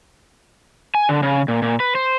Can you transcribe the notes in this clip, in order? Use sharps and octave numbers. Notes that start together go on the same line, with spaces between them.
G#5
D3
C#3
A#2
A#2
B4
C5